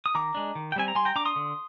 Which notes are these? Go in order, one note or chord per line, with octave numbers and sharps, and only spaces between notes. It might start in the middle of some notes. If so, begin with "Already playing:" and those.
D#6
D#3 A#5 D6
G#3 D4
D#3
G5
G3 C4 G#5
A#5
G3 G#5 C6
G5 A#5
D4 A#5 D6
C6 D#6
D3